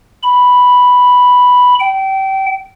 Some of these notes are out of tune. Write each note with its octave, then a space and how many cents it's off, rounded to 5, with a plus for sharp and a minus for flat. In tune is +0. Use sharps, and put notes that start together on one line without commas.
B5 +0
G5 -25